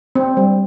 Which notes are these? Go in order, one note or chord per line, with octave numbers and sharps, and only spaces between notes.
C4
G3